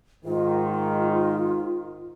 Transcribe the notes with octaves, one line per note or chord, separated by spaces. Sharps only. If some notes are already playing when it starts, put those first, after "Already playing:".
G#2 D#3 F4